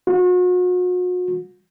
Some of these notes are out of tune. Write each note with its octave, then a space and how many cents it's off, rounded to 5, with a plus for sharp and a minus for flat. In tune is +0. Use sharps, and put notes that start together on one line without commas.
F#4 -40